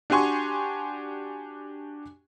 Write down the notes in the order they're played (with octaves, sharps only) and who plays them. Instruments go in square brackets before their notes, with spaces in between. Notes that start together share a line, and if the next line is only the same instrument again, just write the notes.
[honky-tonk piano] D4 F#4 G4 G#5 C6 C#6